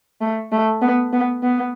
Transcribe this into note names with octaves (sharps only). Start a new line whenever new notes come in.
A3
A3
B3
B3
B3